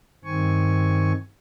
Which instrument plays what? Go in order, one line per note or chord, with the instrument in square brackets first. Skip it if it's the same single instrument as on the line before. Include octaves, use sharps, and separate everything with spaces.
[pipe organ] G2 D#3 C4 G#5 C#6